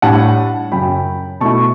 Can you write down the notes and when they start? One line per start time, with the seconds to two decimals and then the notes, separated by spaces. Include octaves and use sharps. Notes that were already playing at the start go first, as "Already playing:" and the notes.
0.02 A2 G3 D4 F#5 A5
0.71 F#2 C#3 F#3 C#4 G5 B5
1.41 B2 A3 E4 A5 C#6